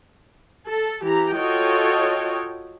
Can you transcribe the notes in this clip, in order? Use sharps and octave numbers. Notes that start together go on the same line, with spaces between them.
A4
E3 G4 A#5
F4 F#4 A4 C#5 D#5 G5